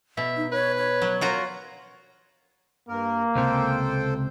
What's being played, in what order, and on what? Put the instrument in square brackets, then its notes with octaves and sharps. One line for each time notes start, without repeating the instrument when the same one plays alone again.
[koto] B2 [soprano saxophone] E5
[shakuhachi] D#4
[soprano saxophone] B4 [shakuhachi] C#5
[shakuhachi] C#5
[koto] F#3
[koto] F4 F#4 A#5 [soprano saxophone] A#4
[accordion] G2 A#4 [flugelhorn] A#3
[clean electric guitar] C#2 C3 [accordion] A4 C5 G5